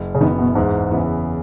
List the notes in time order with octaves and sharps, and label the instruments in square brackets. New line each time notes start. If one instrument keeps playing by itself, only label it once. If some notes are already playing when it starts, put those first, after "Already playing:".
Already playing: [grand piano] F#1
[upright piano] C#3
[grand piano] F#2 E3 B3 [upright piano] D#3
[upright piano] B2
[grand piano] E2 [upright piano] G#2
[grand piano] C#3 E3 B3 E4